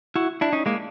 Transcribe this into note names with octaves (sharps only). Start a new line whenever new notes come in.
E4 F#4
D4 E4
C#4 D#4
G#3 A#3